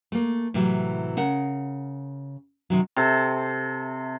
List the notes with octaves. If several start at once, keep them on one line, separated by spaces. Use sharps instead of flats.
A3 A#3
A2 C3 E3 F#3
C#3 A#4 F#5
C3 D#3 F#3
C3 A4